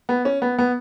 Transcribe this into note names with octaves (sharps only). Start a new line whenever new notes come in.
B3
C#4
B3
B3